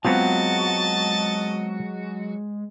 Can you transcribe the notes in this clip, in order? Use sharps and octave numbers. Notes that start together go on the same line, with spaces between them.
F#3 G#3 B3 C4 F4 F#4 D#5 A5